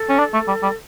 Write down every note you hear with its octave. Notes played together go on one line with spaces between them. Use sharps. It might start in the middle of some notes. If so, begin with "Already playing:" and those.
Already playing: A4
C#4
D4
A3
G3
G3